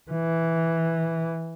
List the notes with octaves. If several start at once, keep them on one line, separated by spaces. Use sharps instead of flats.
E3